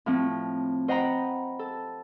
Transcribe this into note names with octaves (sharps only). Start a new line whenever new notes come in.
A2 F3 C4
C5 D#5 F#5 G5 A#5 B5
A4